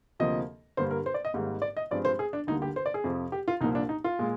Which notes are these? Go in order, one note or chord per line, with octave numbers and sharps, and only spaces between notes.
D2 C3 F3 A#3 D#5
G2 D3 G3 A#3 C5
A#4
C5
D5
D#5
G#1 G#2 G3 A#3
D5
D#5
G2 F3 G#3 C4 D5
C5
G#4
D4
D2 D3 G3 A#3 D#4
G4
C5
D5
G#4
F2 C3 F3
G4
F4
C2 A#2 F3 A#3 D#4
D4
D#4
F4
A#2 G#3